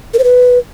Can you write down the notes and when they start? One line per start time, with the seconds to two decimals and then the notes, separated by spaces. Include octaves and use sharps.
0.14 A#4
0.19 C5
0.24 B4